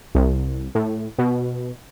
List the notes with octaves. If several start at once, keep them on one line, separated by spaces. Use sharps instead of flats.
C2
A2
B2